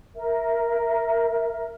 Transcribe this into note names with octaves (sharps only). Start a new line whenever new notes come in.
A#4 E5